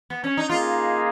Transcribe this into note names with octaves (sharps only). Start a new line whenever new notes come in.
B3
C#4
D#4
A#3 D#4 F4 G#4